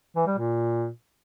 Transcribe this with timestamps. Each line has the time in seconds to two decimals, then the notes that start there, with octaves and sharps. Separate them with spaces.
0.16 E3
0.27 G3
0.38 A#2